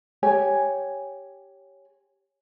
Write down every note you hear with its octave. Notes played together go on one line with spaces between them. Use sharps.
G4 C#5 G#5